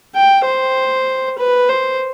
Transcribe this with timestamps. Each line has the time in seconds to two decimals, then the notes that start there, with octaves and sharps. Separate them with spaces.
0.15 G5
0.45 C5
1.38 B4
1.69 C5